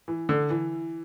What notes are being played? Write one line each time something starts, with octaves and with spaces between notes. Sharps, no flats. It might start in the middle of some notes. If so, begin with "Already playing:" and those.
E3
D3
E3